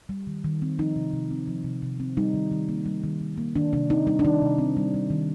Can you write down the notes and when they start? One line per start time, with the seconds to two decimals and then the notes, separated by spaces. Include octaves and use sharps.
0.09 G3
0.27 D#3
0.44 D#3
0.62 C4
0.79 F3 D#4
0.96 C3
1.13 C3
1.31 C4
1.47 F3
1.64 C3
1.82 C3
2.00 C4
2.17 G3 D#4
2.34 D#3
2.51 D#3
2.69 A#3
2.86 G3
3.04 D#3
3.21 D#3
3.38 A#3
3.56 D#3 D4
3.73 C3 D4
3.90 C4 D#4
4.07 G3 D#4
4.19 D4
4.25 D#3 D#4
4.42 C3
4.58 C4
4.77 G3
4.94 G3
5.10 D#3